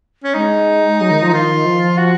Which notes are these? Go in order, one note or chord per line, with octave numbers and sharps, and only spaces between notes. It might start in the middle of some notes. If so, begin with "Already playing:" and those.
C#4
G#3 D#4
F#3
D#3
F3
D#3 F4
F3
F#4